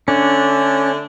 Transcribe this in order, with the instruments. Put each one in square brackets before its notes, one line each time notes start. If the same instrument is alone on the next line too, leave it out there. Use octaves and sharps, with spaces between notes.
[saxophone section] D3 A3 D4 [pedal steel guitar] C#4